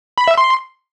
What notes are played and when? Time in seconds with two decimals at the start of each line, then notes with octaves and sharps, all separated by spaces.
0.18 B5
0.28 E5
0.38 C6